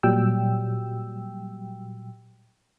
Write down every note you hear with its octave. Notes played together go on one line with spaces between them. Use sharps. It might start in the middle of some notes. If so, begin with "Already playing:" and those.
A#2 F#3 G3 G5 E6